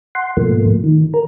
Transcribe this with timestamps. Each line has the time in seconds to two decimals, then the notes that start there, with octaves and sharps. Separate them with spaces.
0.15 F#5 C6
0.37 G#2 B2 F3 A3 A#3
0.84 D#3
1.14 A#4